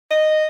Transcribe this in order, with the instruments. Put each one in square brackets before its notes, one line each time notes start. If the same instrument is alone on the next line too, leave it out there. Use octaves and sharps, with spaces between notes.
[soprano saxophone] D#5